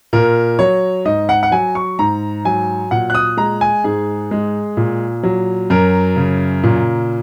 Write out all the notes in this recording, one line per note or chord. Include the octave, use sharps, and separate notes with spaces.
A#2 A#4
F#3 C#5
G#2 D#5
F#5
F#5
F#3 G#5
C#6
G#2 A#5
F#3 G#5
A#2 F#5
F#6
D#6
G#3 A#5
G#5
G#2 G#4
G#3
A#2
F#3
F#2 A#4
C#3
A#2